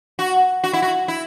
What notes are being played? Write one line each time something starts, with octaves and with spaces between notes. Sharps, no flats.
F#4
F#4
E4
F#4
E4